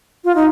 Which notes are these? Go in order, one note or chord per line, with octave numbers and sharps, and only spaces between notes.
F4
D#4